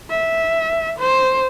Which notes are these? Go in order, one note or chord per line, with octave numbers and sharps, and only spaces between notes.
E5
C5